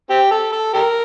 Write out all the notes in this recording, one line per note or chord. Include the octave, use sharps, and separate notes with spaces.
C4 G4
A4
A4
G4 A#4